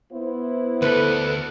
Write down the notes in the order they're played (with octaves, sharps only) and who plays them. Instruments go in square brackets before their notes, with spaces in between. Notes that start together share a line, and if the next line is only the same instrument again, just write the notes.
[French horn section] B3 E4 C5
[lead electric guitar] D2 A4 [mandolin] B4 B5